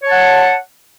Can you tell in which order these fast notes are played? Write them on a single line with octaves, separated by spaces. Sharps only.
C#5 A5 F#5